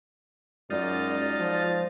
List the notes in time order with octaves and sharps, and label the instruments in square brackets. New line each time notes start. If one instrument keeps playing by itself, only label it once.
[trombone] F#2 [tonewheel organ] G#3 A6 [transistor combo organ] D#4 F4 [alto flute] D5
[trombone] F3